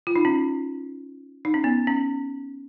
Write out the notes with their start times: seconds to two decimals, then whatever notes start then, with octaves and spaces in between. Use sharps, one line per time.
0.07 F4
0.16 D#4
0.25 C#4
1.45 D#4
1.54 C#4
1.64 B3
1.87 C#4